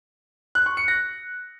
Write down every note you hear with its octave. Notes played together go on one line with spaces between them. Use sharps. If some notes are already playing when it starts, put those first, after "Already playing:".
F#6
C#6
C#7
A#6